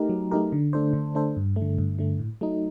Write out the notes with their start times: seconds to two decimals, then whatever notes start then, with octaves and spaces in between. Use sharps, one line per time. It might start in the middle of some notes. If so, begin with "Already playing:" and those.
Already playing: A3 D#4 G4 A#4
0.09 F#3
0.31 A3 D#4 G4 A#4
0.52 D3
0.73 A3 D4 A4 C5
0.93 D3
1.15 A3 D4 A4 C5
1.36 G2
1.56 A3
1.62 D3
1.78 G2
1.99 D3 A3
2.19 A2
2.41 F#3 A3 D#4